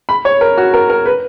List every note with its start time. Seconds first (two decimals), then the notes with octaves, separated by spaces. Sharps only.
0.09 B5
0.25 C#5
0.41 A#4
0.57 F#4
0.74 A#4
0.90 A#4
1.06 B4